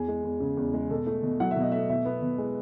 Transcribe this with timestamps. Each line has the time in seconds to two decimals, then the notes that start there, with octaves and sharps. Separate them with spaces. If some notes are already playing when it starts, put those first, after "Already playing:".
Already playing: E2 G#4
0.08 G#3
0.24 E2
0.40 C#3
0.57 E2
0.74 G#3
0.90 B2 A4
1.07 A3
1.23 B2
1.40 F#3 F#5
1.51 E5
1.56 B2 D#5
1.72 A3 E5
1.90 B2 E5
2.05 B3
2.22 B2
2.38 G#3